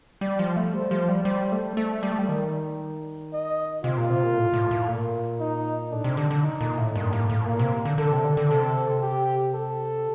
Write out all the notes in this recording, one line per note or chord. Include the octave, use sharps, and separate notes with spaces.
G3 D5
F3
A3
G3 C5
F3
G3
G3 C5
A3
A3 D5
G3
A3
G3
D#3
D#5
C3 F4
A#2
C3
A#2
A2
A2
A2
A#2
D#4
A2 D4
C3
D3
D3
D#4
A#2
A2
G2 A#3
A2
A2
A#2 A#3
C3
D3
D3 A4
C3
D3
D3
C3 A4
G4
A4